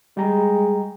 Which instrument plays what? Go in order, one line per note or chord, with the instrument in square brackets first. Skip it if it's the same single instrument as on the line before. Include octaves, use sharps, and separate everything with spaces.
[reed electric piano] G3 G5 A#5 [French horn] G#3